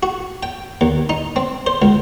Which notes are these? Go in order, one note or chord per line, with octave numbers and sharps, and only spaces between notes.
F#4
G5
D#2
D#4
C4
C5
C#2